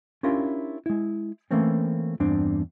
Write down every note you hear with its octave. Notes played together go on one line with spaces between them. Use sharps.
C#4 D4 E4 F4 G4 A#4
G#3 E4
E3 A3 A#3 C4 C#4
E2 G2 C4 D4